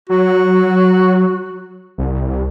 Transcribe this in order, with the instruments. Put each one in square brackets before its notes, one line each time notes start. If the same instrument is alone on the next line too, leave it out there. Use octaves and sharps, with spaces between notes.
[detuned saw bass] F#3 [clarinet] F#4
[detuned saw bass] C2